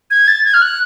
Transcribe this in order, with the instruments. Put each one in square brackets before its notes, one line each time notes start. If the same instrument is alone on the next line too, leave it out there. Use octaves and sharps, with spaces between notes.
[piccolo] G#6
A6
G#6
F6
F#6